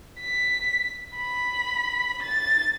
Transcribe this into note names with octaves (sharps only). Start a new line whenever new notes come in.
B6
B5
A6